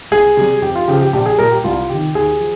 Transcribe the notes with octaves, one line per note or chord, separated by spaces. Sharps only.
C2 G#4
C3 G3
F2 G4
F4
C#3 F3 G4
G4
A#1 G4
G#4
A#2 G3 A#4
G4
C2 F4
C3 D#3 G4
D#2 G#4
F3